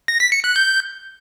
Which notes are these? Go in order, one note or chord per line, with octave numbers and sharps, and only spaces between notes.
A#6
B6
C#7
F#6
G6